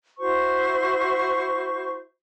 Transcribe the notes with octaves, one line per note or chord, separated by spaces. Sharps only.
E4 F#4 C5 C#6